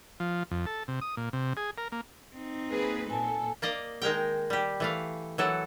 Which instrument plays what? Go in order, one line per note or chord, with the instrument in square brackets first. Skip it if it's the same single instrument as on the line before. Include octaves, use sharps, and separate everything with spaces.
[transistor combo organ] F3
F2
A4
C3
D#6
A#2
C3
G#4
A#4
A#3
[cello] C4 D#4
[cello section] A#3 G#4 B4
[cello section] A#2 A4 [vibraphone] G#5 A5
[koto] A#3 D5 D#5 F5
D#3 G#3 A#4 G5
G3 G4
E3 A3 F5
E3 F#3 A4